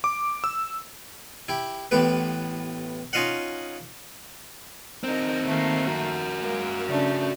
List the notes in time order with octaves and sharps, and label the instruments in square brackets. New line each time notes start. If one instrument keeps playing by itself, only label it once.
[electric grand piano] D6
E6
[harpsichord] E4 G4
A1 A2 B3 G4 B4
C#4 D#4 F4 D#5 F5 F#5
[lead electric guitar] C4 D#4 [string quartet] A#4 D#5
[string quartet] D#3 A3 A#3
[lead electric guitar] F#4 A#4
[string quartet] G#3 A#3
C#3 A3 D4